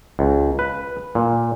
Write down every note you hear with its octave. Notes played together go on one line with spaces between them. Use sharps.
C#2
B4
A#2